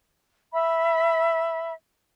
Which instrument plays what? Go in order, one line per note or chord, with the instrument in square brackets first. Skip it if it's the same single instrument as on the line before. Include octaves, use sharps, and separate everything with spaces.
[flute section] E5 B5